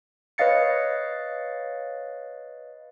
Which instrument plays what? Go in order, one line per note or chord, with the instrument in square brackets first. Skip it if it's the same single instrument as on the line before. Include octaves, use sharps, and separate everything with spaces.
[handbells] B4 C#5 D#5 F5 A6 C#7